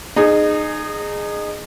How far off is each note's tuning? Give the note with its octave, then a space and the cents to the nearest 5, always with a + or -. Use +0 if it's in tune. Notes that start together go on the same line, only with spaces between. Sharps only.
D#4 -25 G#4 +0